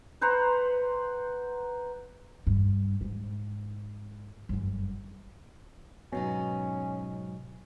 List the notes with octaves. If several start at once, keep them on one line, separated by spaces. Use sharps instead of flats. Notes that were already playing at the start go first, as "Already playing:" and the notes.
B4 C5 F#5 A#5
G2
G#2
G1 F#2
G#2 B2 F#3 C#4 D#4